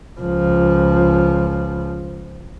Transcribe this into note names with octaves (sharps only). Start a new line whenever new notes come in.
C#2 F3